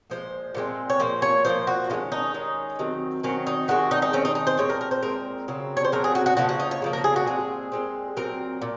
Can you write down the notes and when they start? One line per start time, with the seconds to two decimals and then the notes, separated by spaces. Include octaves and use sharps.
0.10 A#2 F3 G#3 C5
0.55 A#2 F3 G#3 C4
0.90 C#5
0.99 A#2 F3 A#3 C5
1.22 C#5
1.45 A#2 F3 A#3 C5
1.67 F#4
1.90 D#3 G#3 C#4 F4
2.12 D#4
2.34 D#3 G#3 C#4
2.79 D#3 F#3 C4
3.23 D#3 F#3 C4 C#4
3.47 D#4
3.68 D#3 G#3 C4 F#4
3.91 D#4
4.02 D#4
4.13 D#3 G#3 C4 C#4
4.25 D#4
4.35 D#4
4.47 C5
4.58 A#2 G#3 C4 C#5
4.70 A#4
4.81 A#4
4.91 C5
5.03 A#2 G#3 C4 A#4
5.48 C#3 F#3 C4
5.77 C#5
5.84 C5
5.92 C#3 F#3 C4 A#4
6.04 G#4
6.15 F#4
6.26 F#4
6.37 C#3 F3 A#3 F#4
6.49 F#4
6.60 D#4
6.71 C#5
6.82 C#3 F3 A#3
6.93 A#4
7.04 G#4
7.16 F#4
7.26 A#2 G#3 C4 G#4
7.72 A#2 G#3 C4
8.17 A#2 F#3 C4 A#4
8.61 A#2